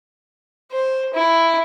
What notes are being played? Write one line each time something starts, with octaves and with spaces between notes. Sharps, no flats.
C5
E4